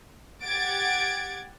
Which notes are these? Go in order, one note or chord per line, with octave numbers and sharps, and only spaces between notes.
G4 F#5 G#6 A6 D7